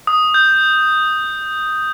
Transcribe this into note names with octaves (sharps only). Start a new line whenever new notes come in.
D#6
G6